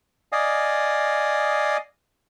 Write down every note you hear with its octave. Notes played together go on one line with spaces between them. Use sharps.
D5 D#5 F5 G#5 D#6